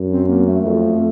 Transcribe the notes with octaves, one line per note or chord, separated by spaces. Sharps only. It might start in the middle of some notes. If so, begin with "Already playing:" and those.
Already playing: F#2
C4
A#3
A3
F2